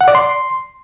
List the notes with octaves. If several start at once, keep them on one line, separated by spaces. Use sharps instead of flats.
F#5
D5
C6